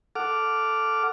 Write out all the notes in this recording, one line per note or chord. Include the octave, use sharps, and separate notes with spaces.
A4 F#5 D6 F6